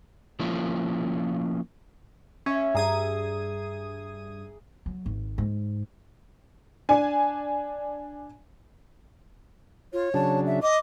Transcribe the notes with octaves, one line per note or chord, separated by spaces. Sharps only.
F3 A#3 C#4 E4 F4
C#4 E5
G2 G#4 G#5 A#5 D#6 G#6
F#3
G#1
G#2
D4 G#5
F4 C#5
C#3 F#3 D4 A5
E5
D#5 D6